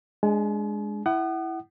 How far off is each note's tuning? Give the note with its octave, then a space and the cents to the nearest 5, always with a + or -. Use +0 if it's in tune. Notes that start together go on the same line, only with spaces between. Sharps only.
G#3 +0 D4 +0 G#5 +45
E4 +0 F#5 +30 D#6 -35